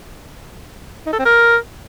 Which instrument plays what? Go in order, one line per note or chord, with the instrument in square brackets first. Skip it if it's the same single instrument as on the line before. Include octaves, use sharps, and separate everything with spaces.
[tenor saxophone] D#4
A4
C4
A#4